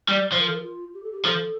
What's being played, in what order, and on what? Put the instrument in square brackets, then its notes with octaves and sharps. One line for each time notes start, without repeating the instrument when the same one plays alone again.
[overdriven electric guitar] G3 [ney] D5
[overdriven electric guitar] F3 [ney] C5
[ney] A#4
A4
A#4
F4
G4
A4
G4
[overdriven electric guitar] F3 [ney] A4